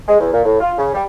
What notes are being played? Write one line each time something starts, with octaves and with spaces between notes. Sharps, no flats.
G#3
E2
A#2
A2
F4
C#3
G3